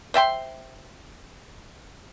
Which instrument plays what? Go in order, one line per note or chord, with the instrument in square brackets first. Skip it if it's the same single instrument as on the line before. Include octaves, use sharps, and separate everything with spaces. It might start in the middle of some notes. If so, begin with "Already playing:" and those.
[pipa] C5 E5 G5 C6